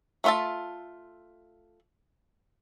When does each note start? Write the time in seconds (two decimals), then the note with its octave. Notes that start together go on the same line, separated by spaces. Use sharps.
0.24 A3 B3 F4 E5 A5